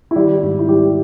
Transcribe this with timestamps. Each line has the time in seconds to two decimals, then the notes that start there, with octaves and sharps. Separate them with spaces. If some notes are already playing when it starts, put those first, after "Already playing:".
0.11 E4
0.16 D#3 G3 G4
0.43 G#2
0.59 E4
0.68 G3 G4